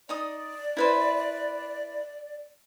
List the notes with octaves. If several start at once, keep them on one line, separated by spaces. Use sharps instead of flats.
D#4 D5 D#5 D#6
E4 B4 C5